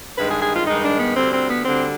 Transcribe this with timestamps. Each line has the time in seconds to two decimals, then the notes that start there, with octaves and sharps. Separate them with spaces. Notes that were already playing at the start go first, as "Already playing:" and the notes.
0.18 G2 D#3 G#3 B4
0.30 G#4
0.42 G#4
0.55 F4
0.67 G2 D#3 G#3 D#4
0.83 D4
0.99 B3
1.16 D2 D3 G3 C4
1.32 C4
1.48 B3
1.65 D2 D3 G3 C4